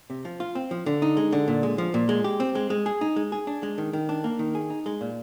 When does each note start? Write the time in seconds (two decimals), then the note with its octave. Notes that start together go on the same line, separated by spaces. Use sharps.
0.10 C3
0.25 F3
0.40 F4
0.55 C4
0.71 F3
0.86 D3
1.02 D#4
1.17 G#3
1.32 D3
1.48 A#2
1.63 G#3
1.78 F3
1.94 A#2
2.09 G#3
2.24 G4
2.40 C4
2.55 G#3
2.70 G#3
2.86 G#4
3.01 D#4
3.16 G#3
3.32 G#4
3.47 D4
3.63 G#3
3.78 D#3
3.93 D#3
4.09 D4
4.24 A#3
4.39 D#3
4.55 G#4
4.70 D#4
4.86 G#3
5.01 A#2